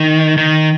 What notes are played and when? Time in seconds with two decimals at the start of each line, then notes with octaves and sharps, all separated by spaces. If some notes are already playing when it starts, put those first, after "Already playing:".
Already playing: D#3
0.37 D#3